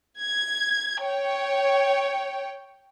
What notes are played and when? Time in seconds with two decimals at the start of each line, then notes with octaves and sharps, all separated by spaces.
0.19 G#6
1.04 C#5 G5